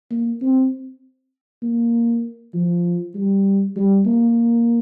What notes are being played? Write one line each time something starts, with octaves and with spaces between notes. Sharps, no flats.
A#3
C4
A#3
F3
G3
G3
A#3